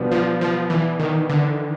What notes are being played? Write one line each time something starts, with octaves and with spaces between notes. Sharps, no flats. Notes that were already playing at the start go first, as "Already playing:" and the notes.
Already playing: B2 F3 G3 B3 D4
F3
F3
E3
D#3
D3